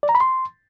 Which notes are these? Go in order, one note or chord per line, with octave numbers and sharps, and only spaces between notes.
D5
A#5
B5
C6